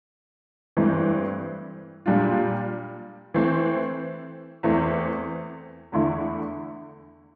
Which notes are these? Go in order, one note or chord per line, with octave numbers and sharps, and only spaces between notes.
G2 E3 A3 C4
A#2 G3 D4 F4
E3 A3 C4
E2 E3 A3 C4
E2 D3 A3 E4